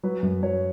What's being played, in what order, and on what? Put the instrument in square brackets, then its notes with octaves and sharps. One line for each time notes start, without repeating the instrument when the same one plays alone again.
[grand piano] F#3 B4
F#2
F#3 C#5